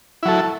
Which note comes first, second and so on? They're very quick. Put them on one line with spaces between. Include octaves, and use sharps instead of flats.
E4 F#3 A4